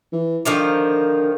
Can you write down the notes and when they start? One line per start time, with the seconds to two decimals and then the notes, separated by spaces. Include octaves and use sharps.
0.13 E3
0.45 D3 D#3 F3 A#3